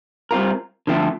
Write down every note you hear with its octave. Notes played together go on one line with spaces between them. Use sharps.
G3 C4 F4 A#4
D3 F3 A3 C4